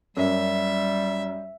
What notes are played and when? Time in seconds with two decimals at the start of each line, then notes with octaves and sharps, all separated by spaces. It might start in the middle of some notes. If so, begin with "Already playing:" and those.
0.17 F#2 G3 E5